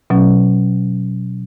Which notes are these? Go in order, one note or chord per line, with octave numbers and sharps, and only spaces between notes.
B2 F#3 C#4